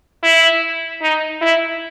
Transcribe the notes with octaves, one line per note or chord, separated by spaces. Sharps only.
E4
D#4
E4